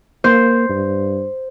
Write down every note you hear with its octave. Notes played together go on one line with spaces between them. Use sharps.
A#3 C5
G2